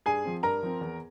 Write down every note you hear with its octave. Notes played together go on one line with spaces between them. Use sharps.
G2 G#4 G#5
F3 C4
G2 A#4 A#5
F3 C4
E2